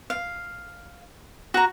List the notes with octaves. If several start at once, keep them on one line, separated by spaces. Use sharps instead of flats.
F5
F#4 A#5